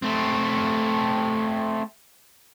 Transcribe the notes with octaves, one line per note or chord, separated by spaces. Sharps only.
A3 C4